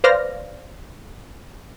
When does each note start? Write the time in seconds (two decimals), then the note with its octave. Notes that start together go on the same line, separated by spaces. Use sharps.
0.04 B4 C5 D5 F5 F6 A#6